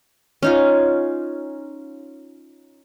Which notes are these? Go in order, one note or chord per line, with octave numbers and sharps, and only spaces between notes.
C#4 D#4 F4